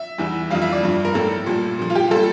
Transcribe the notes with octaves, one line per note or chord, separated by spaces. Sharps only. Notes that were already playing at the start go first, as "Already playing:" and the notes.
Already playing: E5
E2 E3 G3
F2 E3 G3 F5
E5
D5
G2 F3
A#4
A2 G3 A4
A#2 G3
A#2 F3
F4
G4
A#2 G3 A4